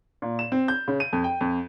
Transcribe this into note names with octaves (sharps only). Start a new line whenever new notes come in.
A#2
E7
C4
G6
C#3
D#7
F2
G5
F2